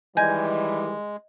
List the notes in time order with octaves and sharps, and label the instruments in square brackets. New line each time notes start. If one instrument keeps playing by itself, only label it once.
[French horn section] D#3 E3 G3 [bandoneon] G#3 [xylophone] D#5 G6 G#6 [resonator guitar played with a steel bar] G#5